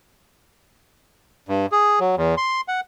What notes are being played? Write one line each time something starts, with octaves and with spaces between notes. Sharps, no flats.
G2
G#4
F#3
E2
C6
F#5